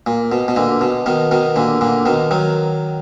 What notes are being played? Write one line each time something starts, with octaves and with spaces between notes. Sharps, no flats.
A#2
B2
B2
A#2 D3
B2
B2 D#3
B2 D#3
A#2 D3
A#2 D3
B2 D#3
D#3 F#3